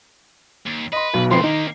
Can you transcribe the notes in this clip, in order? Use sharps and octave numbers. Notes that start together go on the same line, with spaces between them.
D#2
B4 D#5 C6
B1 B2
C#2 F3 C4 B4 C6 C7
D#3 A#3 D#4 G4